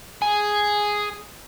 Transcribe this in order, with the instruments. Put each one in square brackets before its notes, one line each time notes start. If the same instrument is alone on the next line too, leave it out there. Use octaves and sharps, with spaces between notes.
[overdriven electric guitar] G#4